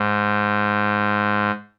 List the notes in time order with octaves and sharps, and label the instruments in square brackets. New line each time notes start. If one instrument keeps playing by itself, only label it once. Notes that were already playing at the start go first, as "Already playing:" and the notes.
Already playing: [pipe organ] G#2